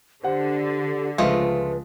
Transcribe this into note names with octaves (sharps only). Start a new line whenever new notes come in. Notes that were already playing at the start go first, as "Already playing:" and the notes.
D3 G4 C5 F#5
C#2 F3 G#3 A3 F4 B4 D#5